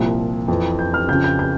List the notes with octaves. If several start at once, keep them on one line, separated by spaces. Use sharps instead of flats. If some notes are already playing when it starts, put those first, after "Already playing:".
Already playing: C2 A#2 F3
F2 E3
G6
F6
F2 C#3 F3 G6
G6
G6